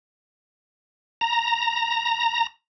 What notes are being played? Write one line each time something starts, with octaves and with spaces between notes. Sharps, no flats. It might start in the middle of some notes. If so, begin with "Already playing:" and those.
A#5